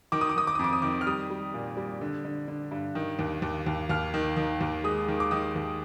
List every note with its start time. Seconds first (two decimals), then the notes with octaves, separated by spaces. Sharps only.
0.12 D#3 D6
0.21 D#6
0.29 D6
0.36 D#3 D#6
0.47 D6
0.55 D#6
0.59 F2
0.64 D6
0.73 D#6
0.82 D#3 D6
1.01 F6
1.07 G3 D#6
1.30 G3
1.54 A#2
1.77 G3
2.01 D3
2.25 D3
2.48 D3
2.71 G2
2.95 D#3
3.19 D#2
3.42 D#2
3.66 D#2
3.89 D#2 F6
4.14 D#3
4.37 D#3
4.61 D#2
4.84 G#3 D#6
5.08 D#3
5.20 D6
5.31 D#3 D#6
5.56 D#2